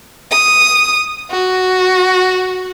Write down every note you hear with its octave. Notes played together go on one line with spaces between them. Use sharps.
D#6
F#4